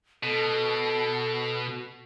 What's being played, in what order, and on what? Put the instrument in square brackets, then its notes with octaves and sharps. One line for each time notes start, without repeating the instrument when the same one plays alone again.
[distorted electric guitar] B2 [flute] A4